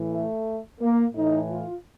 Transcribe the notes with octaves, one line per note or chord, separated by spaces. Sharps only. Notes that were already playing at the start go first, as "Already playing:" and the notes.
Already playing: A2 E3
A3
A#3
A2 E3 D#4
F4